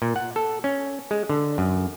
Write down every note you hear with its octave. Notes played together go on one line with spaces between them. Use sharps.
A#2
F#5
A4
C#4
G#3
D3
F#2